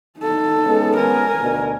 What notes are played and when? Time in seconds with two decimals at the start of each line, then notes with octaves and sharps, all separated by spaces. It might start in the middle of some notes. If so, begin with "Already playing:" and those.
0.19 D#4 A4
0.65 G#3 B3 C#4
0.97 A#4 G#5
1.40 D2 B2 D3